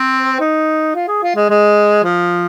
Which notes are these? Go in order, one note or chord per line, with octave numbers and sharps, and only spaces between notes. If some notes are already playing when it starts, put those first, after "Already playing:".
Already playing: C4
D#4
F4
G#4
F4
G#3
G#3
F3